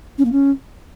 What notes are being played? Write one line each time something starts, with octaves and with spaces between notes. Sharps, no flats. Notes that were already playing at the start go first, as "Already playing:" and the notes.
C#4
A#3
C#4